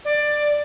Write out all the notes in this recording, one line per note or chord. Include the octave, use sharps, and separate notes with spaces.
D5